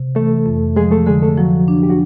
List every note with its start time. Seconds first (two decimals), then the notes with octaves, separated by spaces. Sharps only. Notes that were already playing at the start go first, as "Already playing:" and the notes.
Already playing: C3
0.15 E3 A3 A4
0.46 F2
0.76 F3 G#3 G#4
0.91 A3 A4
1.06 D3 G#3 G#4
1.22 A3 A4
1.37 F3 F#3 F#4
1.68 D4
1.83 G4
1.90 F#4